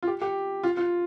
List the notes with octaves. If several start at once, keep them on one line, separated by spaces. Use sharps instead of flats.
F4
G4
G4
F4
F4